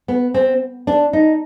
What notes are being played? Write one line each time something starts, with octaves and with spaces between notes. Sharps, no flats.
B3
C4
D4
D#4